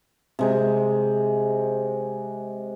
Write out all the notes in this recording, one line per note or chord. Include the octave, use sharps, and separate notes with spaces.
C3 G#3 C5